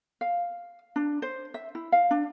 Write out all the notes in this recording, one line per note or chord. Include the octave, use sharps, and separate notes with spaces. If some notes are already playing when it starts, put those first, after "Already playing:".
F5
D4
C5
E5
E4
F5
D4